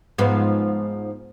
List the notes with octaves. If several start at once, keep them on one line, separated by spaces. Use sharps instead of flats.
G#2 F3 B3